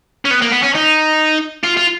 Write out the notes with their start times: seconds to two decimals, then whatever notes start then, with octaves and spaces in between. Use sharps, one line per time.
0.25 C#4
0.31 B3
0.42 A#3
0.52 B3
0.63 C#4
0.75 D#4
1.64 F4
1.77 F4